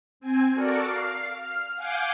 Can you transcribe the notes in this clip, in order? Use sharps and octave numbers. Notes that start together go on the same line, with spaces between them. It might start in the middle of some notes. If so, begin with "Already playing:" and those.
C4 G#5
F#4 A4 A#4 D5
F5 C7
F6
F5 F#5 G#5 D6 G6